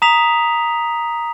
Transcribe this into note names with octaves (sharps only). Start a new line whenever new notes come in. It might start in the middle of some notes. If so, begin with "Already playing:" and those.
A#5 D#6 B6 F7